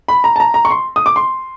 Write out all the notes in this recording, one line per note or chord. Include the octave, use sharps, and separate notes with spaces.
B5
A#5
A5
A#5
A#5
C#6
C6
D#6
D6
C6